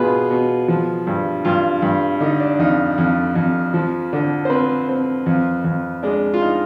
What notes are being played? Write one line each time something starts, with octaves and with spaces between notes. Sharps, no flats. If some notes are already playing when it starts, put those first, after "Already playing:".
Already playing: B2 B3 D4 F4 G#4 B4
B2
F3
G2
G2 F4
G2
D3 D#4
D4
F2 D#4
F2
F2
F3
D3
C5
C4 B4
C4
F2
F2
G#3 D4
F4
D#4